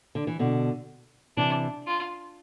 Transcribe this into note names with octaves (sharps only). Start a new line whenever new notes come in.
D3
E3
B2 D3
C3 E3 D4
F4